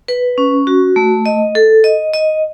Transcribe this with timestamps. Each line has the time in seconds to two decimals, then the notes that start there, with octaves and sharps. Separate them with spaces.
0.08 B4
0.38 C#4
0.67 F#4
0.96 A3
1.26 D#5
1.55 A4
1.84 D#5
2.13 D#5